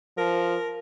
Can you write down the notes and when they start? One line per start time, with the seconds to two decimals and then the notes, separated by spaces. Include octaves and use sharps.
0.18 F3 A#4